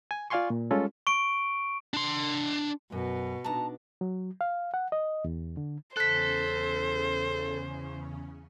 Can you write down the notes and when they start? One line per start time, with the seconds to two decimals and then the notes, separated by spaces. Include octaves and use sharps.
0.11 G#5
0.30 F4 D5 F5 G#5 C6 C#6
0.50 A#2
0.71 G3 G#3 C#4 F4 A4
1.07 C#6 D7
1.94 D4 C6
2.92 F#2 B2
3.44 B3 D4 D#4 A5 A#5
4.01 F#3
4.41 F5
4.74 F#5
4.92 D#5
5.25 E2
5.57 D3
5.97 E2 C#3 C#4 A4 C5 F#6 B6